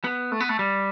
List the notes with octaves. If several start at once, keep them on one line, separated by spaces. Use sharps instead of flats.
B3
A3
B3
A3
G3